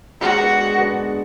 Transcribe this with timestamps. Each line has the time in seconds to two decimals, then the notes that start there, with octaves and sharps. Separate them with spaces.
0.21 G#3 F#4
0.40 B3 D4
0.58 G#3
0.77 B3 D4
0.95 G#3